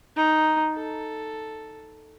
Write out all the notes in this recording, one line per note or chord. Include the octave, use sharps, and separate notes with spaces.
D#4
A4